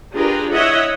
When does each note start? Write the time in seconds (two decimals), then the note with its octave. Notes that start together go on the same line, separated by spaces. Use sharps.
0.13 D4 F4 G4 G#4 A#4 B4
0.53 E4 C#5 D#5 E5 F#5